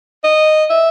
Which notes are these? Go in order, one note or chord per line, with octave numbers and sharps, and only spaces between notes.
D#5
E5